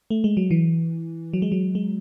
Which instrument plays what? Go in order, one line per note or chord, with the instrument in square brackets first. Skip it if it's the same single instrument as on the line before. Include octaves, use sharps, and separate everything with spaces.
[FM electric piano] A3
G#3
F#3
E3
F#3
G#3
F#3
G#3